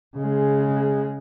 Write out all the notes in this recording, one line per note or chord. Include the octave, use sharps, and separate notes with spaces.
C#3 G#3